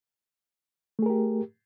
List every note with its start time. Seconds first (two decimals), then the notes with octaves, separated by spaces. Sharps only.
0.99 A3
1.02 G#4
1.06 A#4
1.10 G4